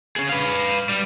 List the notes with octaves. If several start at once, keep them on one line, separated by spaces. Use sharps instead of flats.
C#4 G#4
B4 F5
G3